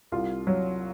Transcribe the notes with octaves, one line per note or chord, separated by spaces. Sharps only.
C2 F4
F#3